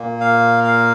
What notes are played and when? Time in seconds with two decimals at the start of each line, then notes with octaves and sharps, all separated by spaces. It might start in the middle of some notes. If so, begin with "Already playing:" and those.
Already playing: A#2 A#3
0.20 F5
0.64 F5